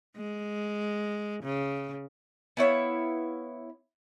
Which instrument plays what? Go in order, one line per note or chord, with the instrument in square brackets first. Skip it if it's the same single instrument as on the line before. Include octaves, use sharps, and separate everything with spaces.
[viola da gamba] G#3
C#3
[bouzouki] B3 E4 C#5 F5